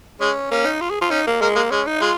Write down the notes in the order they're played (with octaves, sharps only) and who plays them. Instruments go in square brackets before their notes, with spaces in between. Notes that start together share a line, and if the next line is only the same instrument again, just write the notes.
[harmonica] G#3 [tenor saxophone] C#4
[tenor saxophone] A#3 [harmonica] C#4
[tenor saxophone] D#4
F4
G#4
F4
[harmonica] C#4 [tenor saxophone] D#4
[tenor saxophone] A#3
[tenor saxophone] G#3 [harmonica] A#3
[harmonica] G#3 [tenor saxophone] A#3
[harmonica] G#3 [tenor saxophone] C#4
[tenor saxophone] D#4
[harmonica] G#3 [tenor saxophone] F4